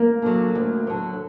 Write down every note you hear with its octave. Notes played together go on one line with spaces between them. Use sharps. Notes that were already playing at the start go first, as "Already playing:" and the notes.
Already playing: A#3
D3 F#3
D2
D3 F#3